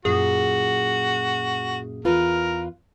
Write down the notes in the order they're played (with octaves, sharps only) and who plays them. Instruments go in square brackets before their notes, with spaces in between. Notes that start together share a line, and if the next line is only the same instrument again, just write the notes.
[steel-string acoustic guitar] F#2 A#2 [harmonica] F#4 [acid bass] G#4
[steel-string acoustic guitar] E2 F4 B4 [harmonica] A#4